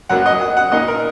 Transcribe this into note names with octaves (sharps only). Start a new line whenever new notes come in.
F#2 F#3 A#3 F#5
D#5
F#5
F#5
A#2 A#3 D#4 D#5
A#4